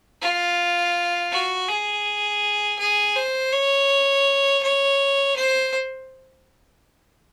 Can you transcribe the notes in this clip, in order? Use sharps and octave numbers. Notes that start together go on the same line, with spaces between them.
F4
F#4
G#4
G#4
C5
C#5
C#5
C5